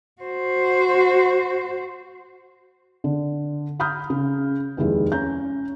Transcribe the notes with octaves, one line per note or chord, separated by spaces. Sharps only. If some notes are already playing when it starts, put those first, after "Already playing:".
F#4 C5
D3
A#5 B5 D#6 F6 G6
C#3
F1 D#2 G#3 E4 G#4
C#4 A#5 G6